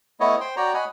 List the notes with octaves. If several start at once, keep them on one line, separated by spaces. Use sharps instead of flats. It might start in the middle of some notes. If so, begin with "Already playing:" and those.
A3 B3 E4 C#5 D#5
C5 G5 C6
F#4 C#5 D5 G5 A#5
C#5 D#5 F#5 G#5 B5